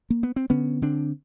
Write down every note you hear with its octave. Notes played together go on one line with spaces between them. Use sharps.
A#3
B3
C4
D3 B3 C#4
D3 C4 D4